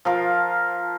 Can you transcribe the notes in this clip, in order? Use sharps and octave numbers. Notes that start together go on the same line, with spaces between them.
F3 A#4 F5